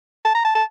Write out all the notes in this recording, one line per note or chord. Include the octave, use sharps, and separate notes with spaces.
A5
A#5
A5
A5